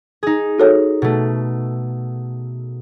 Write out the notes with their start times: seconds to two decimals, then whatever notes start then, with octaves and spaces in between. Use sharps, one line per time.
0.23 D#4 G#4
0.58 F#4 A4 C#5
1.02 B2 A3